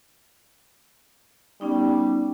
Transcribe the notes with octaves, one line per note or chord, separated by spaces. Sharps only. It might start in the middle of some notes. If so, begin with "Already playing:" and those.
G3 B3 C#4 D#4